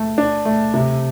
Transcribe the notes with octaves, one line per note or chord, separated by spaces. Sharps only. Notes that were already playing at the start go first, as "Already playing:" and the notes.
Already playing: A3
D4
A3
C3